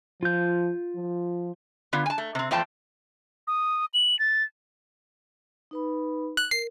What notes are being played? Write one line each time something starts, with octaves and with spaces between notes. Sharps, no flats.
F3 F4 G6
F3
D3 B3 F4
G#5 A5
A3
C3 C4
E2 F3 A3 C5 G5 A5
D#6
F#7
A6
D#4 B4 B5
F#6
A#4 C7